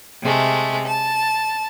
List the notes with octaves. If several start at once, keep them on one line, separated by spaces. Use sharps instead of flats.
C3 G#3 A3
A5